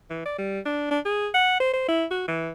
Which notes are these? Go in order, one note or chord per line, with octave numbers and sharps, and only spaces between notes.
E3
D5
G3
D4
D4
G#4
F#5
C5
C5
E4
F#4
E3